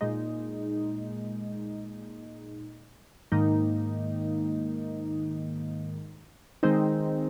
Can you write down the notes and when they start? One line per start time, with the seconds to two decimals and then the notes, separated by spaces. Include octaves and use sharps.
0.01 A#2 G#3 D#4
3.32 G#2 D#3 A#3 D#4
6.63 D#3 G#3 C4 D#4